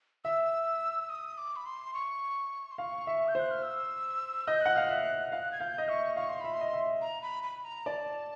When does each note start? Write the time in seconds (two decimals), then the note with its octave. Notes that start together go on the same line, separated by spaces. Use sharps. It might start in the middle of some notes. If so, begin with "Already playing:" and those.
0.24 E5 E6
1.09 D#6
1.38 D6
1.56 B5
1.66 C6
1.94 C#6
2.71 C6
2.78 F5 C#6
3.07 E5
3.28 G6
3.35 C5 F#6
3.51 F6
3.63 E6
4.48 D#5 G6
4.61 F#5 F#6
4.75 F5 F6
4.89 E5 F#6
5.32 F5 F#6
5.52 G#6
5.60 F5 G6
5.78 D#5
5.88 E5 C#6
6.16 F5 C#6
6.29 C6
6.41 E5 B5
6.54 C6
6.61 D#5
6.73 E5
7.01 A#5
7.22 B5
7.43 B5
7.64 A#5
7.86 D5 A5